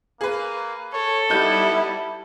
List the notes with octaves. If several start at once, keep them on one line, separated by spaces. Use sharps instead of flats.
A#3 G#4 B4
A4 C#5
G3 B3 D#4 E4 G6